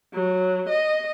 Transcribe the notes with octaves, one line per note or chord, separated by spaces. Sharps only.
F#3
D#5